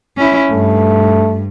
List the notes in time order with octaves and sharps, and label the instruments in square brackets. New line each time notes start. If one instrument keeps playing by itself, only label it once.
[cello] C#4 E4
[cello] G2 [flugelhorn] A3